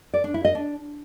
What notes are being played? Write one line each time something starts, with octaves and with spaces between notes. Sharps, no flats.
D5
D4
E4
D#5
D4